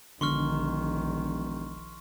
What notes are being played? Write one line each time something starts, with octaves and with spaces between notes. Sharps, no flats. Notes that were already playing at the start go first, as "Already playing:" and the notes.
E1 A#1 D3 D#3 C6 C#6 F6